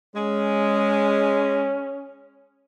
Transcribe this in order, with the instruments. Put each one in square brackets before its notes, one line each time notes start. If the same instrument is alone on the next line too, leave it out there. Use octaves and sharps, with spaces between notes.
[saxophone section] G#3 [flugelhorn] C#4